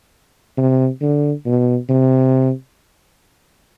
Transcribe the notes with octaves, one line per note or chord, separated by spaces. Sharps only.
C3
D3
B2
C3